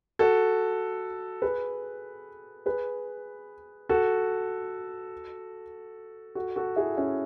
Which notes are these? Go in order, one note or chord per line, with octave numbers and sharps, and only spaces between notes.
F#4 A4
G#4 B4
G#4 B4
F#4 A4
F#4 A4
F#4 A4
E4 G#4
C#4 E4